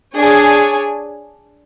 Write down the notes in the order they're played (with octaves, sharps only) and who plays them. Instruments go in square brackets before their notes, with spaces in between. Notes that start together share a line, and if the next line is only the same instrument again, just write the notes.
[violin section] D4 G#4 C#5 G#5